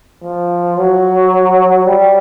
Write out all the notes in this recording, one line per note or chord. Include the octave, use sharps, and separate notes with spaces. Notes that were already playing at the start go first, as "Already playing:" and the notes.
F3
F#3
G3